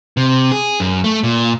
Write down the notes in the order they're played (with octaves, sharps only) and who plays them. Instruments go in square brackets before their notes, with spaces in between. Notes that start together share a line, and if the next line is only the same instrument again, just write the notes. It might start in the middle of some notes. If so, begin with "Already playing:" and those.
[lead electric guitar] C3
G#4
F#2
A3
A#2